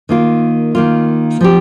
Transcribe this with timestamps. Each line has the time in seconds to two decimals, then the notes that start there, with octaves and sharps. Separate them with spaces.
0.09 D#3 A#3 F4
0.75 D#3 A#3 F4
1.41 F3 C4 G4